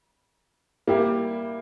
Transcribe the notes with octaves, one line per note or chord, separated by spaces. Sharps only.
G3 A#3 E4 G4